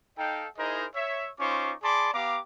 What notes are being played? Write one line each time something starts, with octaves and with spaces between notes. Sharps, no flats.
D#4 A4 D#5 F5 G5
D#4 E4 G#4 A#4 C5 D#5
C#5 E5
C#4 D#4 F4 C5 C#6 D6
G#4 D5 A5 B5 C6 D6
B3 G4 F5 A#5 D6